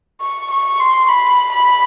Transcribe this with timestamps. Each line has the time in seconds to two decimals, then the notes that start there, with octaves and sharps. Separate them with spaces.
0.21 C#6
0.51 C#6
0.80 C6
1.09 B5
1.52 B5